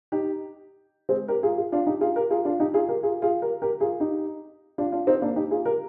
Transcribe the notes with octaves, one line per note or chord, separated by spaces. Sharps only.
D#4 G4
G#3 C4
G4 A#4
F4 G#4
F4 G#4
D4 F4
D#4 G4
F4 G#4
G4 A#4
F4 G#4
D4 F4
D#4 G4
F4 G#4
G4 A#4
F4 G#4
F4 G#4
G4 A#4
G4 A#4
F4 G#4
D#4 G4
D4 F4
D4 F4
C4 D#4
A#3 D4
D#4 G4
F4 G#4
G4 A#4